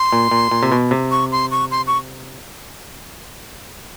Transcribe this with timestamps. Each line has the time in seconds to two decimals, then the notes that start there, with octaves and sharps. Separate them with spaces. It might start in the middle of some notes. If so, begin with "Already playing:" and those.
Already playing: C6
0.12 A#2
0.31 A#2
0.51 A#2
0.63 C3
0.72 B2
0.91 C3
1.11 C#6
1.32 C6
1.51 C#6
1.71 C6
1.87 C#6